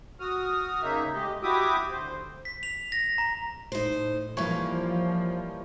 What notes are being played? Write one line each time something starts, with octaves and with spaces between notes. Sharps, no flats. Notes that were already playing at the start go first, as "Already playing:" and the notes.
F#4 D#6 F6
C#3 A#3 D#4 E5
G#3 A3 G4 D#5
E4 F#4 G4 E5 D6 D#6
D2 C5
B6
F7
A#6
A#5
A2 D#4 C5
E3 F3 G3 A#3 C#5